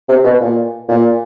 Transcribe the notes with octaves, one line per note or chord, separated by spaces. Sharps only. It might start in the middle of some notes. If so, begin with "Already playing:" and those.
C3
B2
A#2
A#2